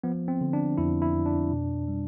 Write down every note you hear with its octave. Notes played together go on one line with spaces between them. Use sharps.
F3 B3
C4
D3
D4
F2 E4
E4
F2
D4
B2
G3